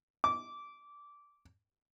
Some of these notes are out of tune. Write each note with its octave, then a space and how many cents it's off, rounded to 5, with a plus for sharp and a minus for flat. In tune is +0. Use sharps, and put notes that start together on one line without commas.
D6 -15